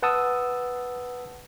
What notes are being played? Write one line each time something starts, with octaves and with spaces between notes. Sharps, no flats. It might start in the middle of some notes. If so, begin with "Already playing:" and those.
B4 F#5 A5 D#6 E6